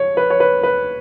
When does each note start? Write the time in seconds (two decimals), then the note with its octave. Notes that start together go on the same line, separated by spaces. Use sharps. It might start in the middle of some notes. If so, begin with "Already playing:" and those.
Already playing: C#5
0.17 B4
0.30 C#5
0.40 B4
0.63 B4